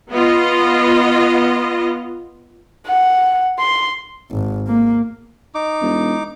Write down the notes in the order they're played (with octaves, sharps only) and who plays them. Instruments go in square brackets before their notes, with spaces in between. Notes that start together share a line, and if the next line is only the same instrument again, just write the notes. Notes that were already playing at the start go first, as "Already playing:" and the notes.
[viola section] B3 F4 D#5
[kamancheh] F#5
C6
[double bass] G#1
A#3
[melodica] D#4 D6
[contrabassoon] E1